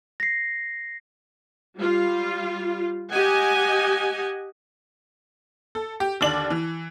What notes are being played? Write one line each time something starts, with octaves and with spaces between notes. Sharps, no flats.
A#6 C7
G3 F4
G4 D#5 F#5 G#5
A4
G4
D#2 D3 D5 F#7
E3